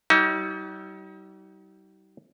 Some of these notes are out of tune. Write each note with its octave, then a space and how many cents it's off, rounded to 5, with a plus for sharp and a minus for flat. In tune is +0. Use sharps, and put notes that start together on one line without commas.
G3 -40 D#4 +35